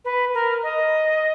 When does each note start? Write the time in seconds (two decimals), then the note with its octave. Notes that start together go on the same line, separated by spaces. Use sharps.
0.05 B4
0.34 A#4
0.63 D#5